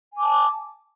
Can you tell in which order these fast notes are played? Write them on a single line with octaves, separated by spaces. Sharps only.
G#5 D6 A5